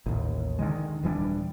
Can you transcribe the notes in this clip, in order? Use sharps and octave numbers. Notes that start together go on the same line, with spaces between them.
A1 D#2
D3 D#3 G#3
D#1 E3 G3 D4